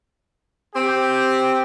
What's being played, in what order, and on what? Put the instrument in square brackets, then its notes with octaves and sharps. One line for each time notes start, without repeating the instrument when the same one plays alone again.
[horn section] C4 G4